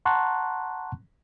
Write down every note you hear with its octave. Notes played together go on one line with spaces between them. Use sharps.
F#5 A5 A#5 C6 C#6 F#6